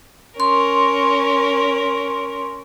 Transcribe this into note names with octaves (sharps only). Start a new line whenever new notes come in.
C#4 A#4 C6